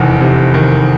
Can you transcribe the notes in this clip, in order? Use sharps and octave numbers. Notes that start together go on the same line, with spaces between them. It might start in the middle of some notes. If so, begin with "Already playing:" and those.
Already playing: F1 E2 D#3
C3
D#3